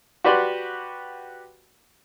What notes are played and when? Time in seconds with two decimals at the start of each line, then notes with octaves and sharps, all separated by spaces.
0.24 F#4 G4 B4 D5 F#5 C6